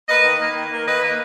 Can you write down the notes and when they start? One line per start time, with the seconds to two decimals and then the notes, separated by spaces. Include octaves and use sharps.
0.09 A#3 B4 D#5
0.24 D#3
0.40 A#3
0.55 D#3
0.72 A#3
0.87 D#3 B4 D#5
1.03 A#3